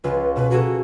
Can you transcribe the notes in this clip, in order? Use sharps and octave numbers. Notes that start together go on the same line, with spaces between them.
C#2 F4 B4 C#6
B2 B4
A#3 F#4 G#4 A4